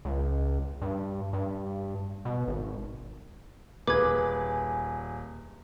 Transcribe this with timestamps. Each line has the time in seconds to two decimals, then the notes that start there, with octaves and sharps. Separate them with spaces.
0.05 C#2
0.82 G2
1.33 G2
2.25 B2
2.48 G#1
3.87 D#1 G#4 B4 G#5 D6 G#6